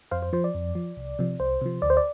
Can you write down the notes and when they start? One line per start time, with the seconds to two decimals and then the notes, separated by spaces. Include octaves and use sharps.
0.11 F2 C5 F5
0.22 C5
0.33 F3 C5
0.44 D5
0.54 F2
0.75 F3
0.97 C2
1.19 C3 F3
1.39 C2 C5
1.61 C3 F3
1.82 D2 D5
1.90 C5
1.97 D5